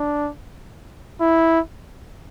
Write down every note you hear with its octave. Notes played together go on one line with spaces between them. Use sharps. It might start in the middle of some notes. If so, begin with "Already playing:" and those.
Already playing: D4
E4